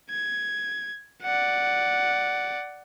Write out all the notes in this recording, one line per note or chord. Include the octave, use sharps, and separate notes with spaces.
G#6
D5 F#5